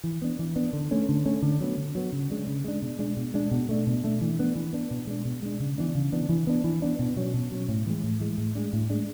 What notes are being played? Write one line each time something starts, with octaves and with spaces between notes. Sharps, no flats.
E3
B3 D4
E3
B3 D4
D3
A3 C#4
D3
A3 C#4
D3
F#3 B3
D3
F#3 B3
C#3
G#3 D4
C#3
G#3 D4
B2
G#3 D4
B2
G#3 D4
B2
A3 D4
B2
A3 D4
E3
B3 D4
E3
B3 D4
B2
G#3 D4
B2
G#3 D4
C#3
E3 B3 D4
C#3
E3 B3 D4
E3
B3 D4
E3
B3 D4
B2
F#3 C#4
B2
F#3 C#4
A2
E3 G#3
A2
E3 G#3
A2
G#3 D4
A2
G#3 D4